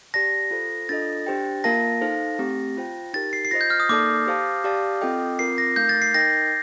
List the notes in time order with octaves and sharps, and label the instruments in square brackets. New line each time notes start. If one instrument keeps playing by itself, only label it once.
[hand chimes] G4 D5 A5 [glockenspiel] A#6
[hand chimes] F4 A4 C5
[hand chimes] D4 F4 A4 D#5 [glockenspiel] A6
[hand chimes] D4 G4 C5 G5
[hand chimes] A#3 F4 A#4 F5 A5 [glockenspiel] A#6
[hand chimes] D#4 A4 C5 F5
A3 C4 G4
F4 C5 G5
[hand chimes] D#4 G4 A#4 [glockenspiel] A6
[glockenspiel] C7
C7
[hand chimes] F4 C5 D#5 [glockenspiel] A#6
[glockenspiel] G6
F6
D#6
[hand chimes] A#3 D#4 A4 D5 A5 [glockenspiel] D6
[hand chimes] G4 C5 F5 A5
G4 D5 F5 A5
C4 F4 A4 D#5 G5
[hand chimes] C4 F4 A#4 [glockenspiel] C7
[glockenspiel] A#6
[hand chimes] A3 D#4 A#4 F5 [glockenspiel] G6
[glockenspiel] A6
C7
[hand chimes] D#4 A#4 D#5 G5 [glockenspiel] A#6